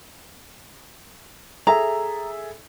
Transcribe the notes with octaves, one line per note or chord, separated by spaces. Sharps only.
G#4 A4 E5 A#5